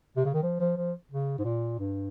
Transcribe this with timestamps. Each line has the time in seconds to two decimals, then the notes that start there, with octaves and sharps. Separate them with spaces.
0.17 C3
0.25 C#3
0.34 D#3
0.42 F3
0.60 F3
0.76 F3
1.11 C#3
1.38 G#2
1.44 A#2
1.79 G2